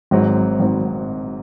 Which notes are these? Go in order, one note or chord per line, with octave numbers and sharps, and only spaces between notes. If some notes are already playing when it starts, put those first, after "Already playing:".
G#1 G#2 F#3 C4
G#1 F#3 C4